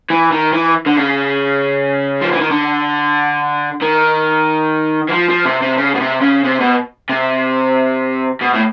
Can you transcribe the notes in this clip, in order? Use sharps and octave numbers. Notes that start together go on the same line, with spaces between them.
E3
D#3
E3
D3
C#3
F3
E3
D#3
D3
D#3
E3
F3
F3
C3
C3
C#3
B2
C3
C#3
C3
B2
C3
B2
A2